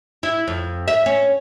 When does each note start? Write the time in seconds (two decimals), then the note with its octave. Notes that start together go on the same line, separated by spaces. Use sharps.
0.23 E4
0.48 F2
0.88 E5
1.06 C#4